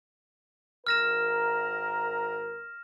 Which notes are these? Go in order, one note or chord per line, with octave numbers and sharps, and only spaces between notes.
G#1 A#4 F6 A#6 E7